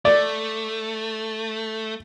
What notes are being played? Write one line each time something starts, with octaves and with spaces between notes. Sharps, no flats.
A3 D5